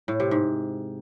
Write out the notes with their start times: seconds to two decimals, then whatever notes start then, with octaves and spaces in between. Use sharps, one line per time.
0.08 A2
0.20 C3
0.31 G#2